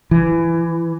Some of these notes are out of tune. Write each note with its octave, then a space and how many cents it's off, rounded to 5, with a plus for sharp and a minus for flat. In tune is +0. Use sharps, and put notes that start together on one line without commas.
E3 +20